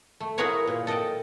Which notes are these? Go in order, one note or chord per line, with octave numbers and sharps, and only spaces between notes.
A3
E4 F#4 G#4 A#4 B4 C#5
A#2
A4 D#5 F#5 G5 A5